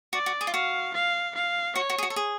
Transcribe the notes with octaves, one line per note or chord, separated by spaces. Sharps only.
F#4 D5
F#4
G#4
F4
F#4 F5
F5
F5
F#4 C#5
F#4
G#4
F#4
A4
G#4